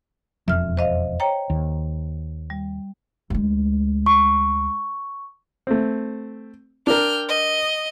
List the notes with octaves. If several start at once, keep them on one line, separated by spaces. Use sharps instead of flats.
E1 F2 E5 F6
C5 D#5 F5
C#5 G5 A#5
D#2
G3
D2 G#3
C#6
A3 C4
D4 A#4 G5 F6
D#5